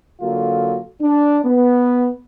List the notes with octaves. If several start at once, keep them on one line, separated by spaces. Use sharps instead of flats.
D3 F#3 A#3 F4 F#4 A4
D4
B3